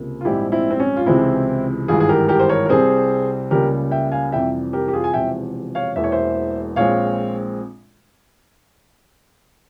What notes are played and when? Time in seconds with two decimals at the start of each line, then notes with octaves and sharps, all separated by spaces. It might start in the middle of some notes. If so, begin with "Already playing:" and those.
Already playing: C#2 C3 A#3
0.21 F4
0.25 A#1 G#2 G3 C4 E4 G4
0.52 C4 E4
0.70 C4
0.80 C#4
0.96 F4
1.06 C#2 C3 E3 G#3 C4 E4
1.88 G#1 G2 E3 G#3 F4 G#4
2.00 G#4
2.09 G4 A#4
2.28 G4 A#4
2.39 C5
2.49 A#4 C#5
2.66 A#4
2.69 C2 C3 G3 C4 G#4 C5
3.51 C#2 C#3 G3 A#3 G4 A#4
3.91 E5 G5
4.12 F5 G#5
4.32 F2 C3 E3 G3 E5 G5
4.73 G4 A#4
4.88 G4
4.93 F4 G#4
5.04 G#5
5.14 E1 E2 C3 F3 E5 G5
5.75 C#5 F5
5.96 E1 E2 E3 A#3 E5
6.04 C#5
6.12 C5 E5
6.76 A#1 A#2 G#3 C4 C#5 F5